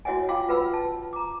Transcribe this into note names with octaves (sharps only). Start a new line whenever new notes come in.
E4 F#4 C#5 D#5 F#5 G#5
F4 F5 G5 C6 D6
F4 B4 F#5 B5 E6
A5
A#5 D6